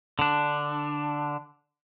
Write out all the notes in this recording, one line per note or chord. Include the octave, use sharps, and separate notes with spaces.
D3 D4